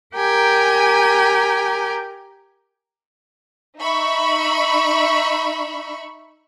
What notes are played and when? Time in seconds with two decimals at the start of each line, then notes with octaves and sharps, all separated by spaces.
0.16 G4 A#4 G5 G#5 A#5
3.79 D#4 E5 B5 C#6